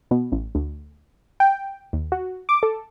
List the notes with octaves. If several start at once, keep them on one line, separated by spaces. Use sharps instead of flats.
B2
A1
D2
G5
D#2
F#4
D6
A4